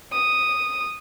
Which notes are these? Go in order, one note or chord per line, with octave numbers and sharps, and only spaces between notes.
D#6